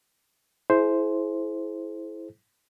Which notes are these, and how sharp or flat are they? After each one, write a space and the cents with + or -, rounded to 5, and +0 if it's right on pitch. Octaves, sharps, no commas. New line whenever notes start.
E4 +0 G#4 +40 C5 +0